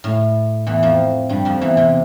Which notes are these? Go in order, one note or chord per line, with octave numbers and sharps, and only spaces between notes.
A2
E2 E3
F2 F3
G2 G3
F2 F3
E2 E3
C3